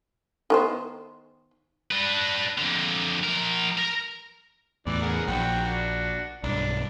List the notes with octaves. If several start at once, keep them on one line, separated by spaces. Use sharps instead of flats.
D#3 B3 C5
D4 B4
F2 D3
F3 A#4
A#4 A#5
E2 A2 E3 D5
G#4 A#4 F#5
A#1 F#4 G5
D4 F#4
B1 G2 D4